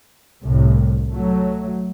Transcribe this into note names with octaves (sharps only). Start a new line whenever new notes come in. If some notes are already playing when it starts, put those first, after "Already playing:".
C2 A2
F#3 A3